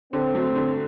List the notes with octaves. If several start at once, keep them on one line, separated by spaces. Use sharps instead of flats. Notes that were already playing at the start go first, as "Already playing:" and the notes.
D3 C4
F#3 A3
D3